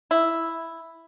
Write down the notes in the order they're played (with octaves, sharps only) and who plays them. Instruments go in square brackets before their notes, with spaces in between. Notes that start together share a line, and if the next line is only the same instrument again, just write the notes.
[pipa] E4